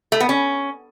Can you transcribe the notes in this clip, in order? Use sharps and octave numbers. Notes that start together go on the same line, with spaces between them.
A3
B3
C#4